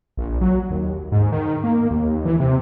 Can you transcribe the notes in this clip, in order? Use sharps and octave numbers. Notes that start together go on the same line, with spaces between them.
A#1
F#3
D#2
G#2
D#3
A#3
D#2
E3
C3